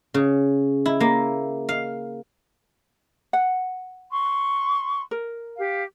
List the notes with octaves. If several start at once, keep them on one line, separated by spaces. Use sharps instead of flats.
C#3
E4
A#3
F5
F#5
C6 C#6
A#4
G4 F5